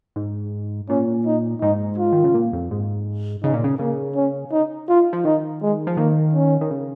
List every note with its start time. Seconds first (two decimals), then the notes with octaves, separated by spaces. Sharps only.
0.16 G#2
0.89 A#2 C#4
1.26 D#4
1.61 G#2 D#4
1.98 F4
2.13 D#3
2.24 C#3
2.34 A#2
2.53 F2
2.71 G#2
3.43 C#3 D#4
3.54 A#2
3.64 C#3
3.79 C#3 A#3
4.15 C#4
4.52 D#4
4.89 F4
5.13 F3
5.25 D#3 D#4
5.62 G#3
5.87 F3
5.97 D#3 A#3
6.33 C#4
6.61 D#3
6.71 C#3